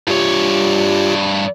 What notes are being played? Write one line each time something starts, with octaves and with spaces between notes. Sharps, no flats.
G2 F4 G4 C#5